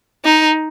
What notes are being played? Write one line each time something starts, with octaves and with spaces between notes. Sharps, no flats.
D#4